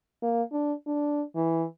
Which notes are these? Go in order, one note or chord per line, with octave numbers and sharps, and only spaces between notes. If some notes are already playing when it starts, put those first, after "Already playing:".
A#3
D4
D4
E3